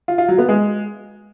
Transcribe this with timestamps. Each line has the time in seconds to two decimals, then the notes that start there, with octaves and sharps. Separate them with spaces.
0.08 F4
0.18 F4
0.28 F#3
0.39 B3
0.49 G#3